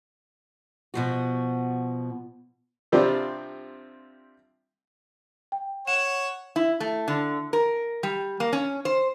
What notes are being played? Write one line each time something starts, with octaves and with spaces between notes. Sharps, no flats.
B2 F3 F#4
C3 F3 G3 C4 D4 F4
G5
C#5 F#5 E7
E4
A3
D3
A#4
G3
A#3
C#4
C5